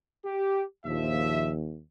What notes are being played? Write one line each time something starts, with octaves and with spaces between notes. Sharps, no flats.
G4
A#1 D#2 F3 E5